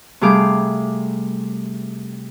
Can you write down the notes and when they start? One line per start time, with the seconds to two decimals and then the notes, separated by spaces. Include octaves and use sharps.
0.21 C3 G3 A3 G#4 F5 D6